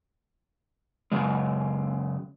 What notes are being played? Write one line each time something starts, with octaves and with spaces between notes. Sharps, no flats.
F#2 C#3 G#3